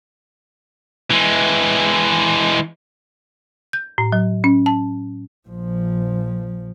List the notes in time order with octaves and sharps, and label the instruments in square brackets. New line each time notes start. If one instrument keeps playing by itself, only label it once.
[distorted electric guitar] E3 G#3
[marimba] G6
A2
F#3
C#4
A5
[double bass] A#1 F3